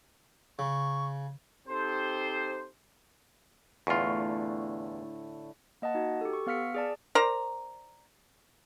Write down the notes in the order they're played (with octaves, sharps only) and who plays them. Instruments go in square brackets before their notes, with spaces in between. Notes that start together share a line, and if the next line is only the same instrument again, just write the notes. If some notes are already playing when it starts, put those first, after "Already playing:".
[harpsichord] C#3 [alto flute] C#6
[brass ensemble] C4 D#4 G4 A4 C5
[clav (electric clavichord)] E2 F4 [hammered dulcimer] A2 D3 C#6
[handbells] A#3 D#5 F#5 A5
D#4 F#4
G4 A4
C#6
B3 F5 F6 B6 C#7
G#4 D5 A5
[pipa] A#4 C5 D5 A#5